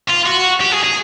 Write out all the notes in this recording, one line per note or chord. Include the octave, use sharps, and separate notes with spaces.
F4
F#4
G4
G#4
G#4